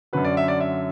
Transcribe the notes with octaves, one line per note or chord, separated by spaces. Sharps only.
F#2 D3 F#3 B4
D5
E5
D5
E5